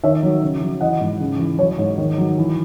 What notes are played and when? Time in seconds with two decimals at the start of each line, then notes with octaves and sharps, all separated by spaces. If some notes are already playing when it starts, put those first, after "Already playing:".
0.04 D#3 C#5 E5
0.23 F#3
0.42 C#3
0.61 F#3
0.80 E3 D#5 F#5
1.00 G#2
1.20 C#3
1.39 E3
1.59 F#3 C#5
1.78 G#2
1.98 D#3
2.18 F#3
2.38 E3